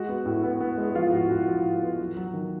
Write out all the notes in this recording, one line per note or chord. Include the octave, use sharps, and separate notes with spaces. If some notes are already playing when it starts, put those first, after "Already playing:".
Already playing: G#3 F#4
B3
A2
B3
B3
G#3
F3 F4
A2 F#4
A2 F#4
F3
A2
B3
F#3
F#3
D#3